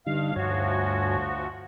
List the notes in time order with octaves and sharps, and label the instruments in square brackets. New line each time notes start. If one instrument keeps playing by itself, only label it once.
[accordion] G2 F5 [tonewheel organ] D3 G3 D#4
[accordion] D2 F3 F#4 [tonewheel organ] G2 C#5 G#5